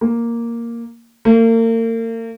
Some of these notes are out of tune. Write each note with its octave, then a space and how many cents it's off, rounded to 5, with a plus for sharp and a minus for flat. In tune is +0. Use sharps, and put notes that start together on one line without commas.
A#3 +0
A#3 -40